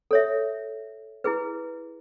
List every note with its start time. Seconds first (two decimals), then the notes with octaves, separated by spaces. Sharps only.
0.11 A4 C#5 E5
1.24 E4 G#4 B4